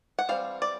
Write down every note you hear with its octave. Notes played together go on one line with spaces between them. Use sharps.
F#5
E3 G3 C4 F5
D5